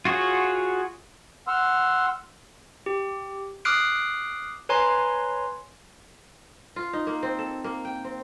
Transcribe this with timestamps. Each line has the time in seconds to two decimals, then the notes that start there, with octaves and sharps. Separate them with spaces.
0.05 F4 F#4 G#4 C#5
1.48 F#5 C6 E6 F6
2.86 G4
3.65 D6 D#6 F6 F#6 C7 D7
4.69 B4 C#5 G#5 A#5 C6
6.76 F4
6.93 D#4
7.07 A#3
7.23 C4
7.39 A4
7.64 A#3
7.85 G5
8.04 C4